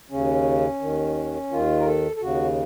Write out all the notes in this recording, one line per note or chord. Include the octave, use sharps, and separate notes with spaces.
D#2 C#3 C#4
D#2 D#3
D#2 D#3 F4
A#4
A4
A4
D#2 C#3 F#4